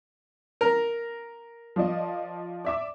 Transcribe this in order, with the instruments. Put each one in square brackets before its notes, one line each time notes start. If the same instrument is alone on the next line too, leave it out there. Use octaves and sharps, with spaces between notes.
[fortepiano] A#4
[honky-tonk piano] F3 D5 D#5
D5 E5 D6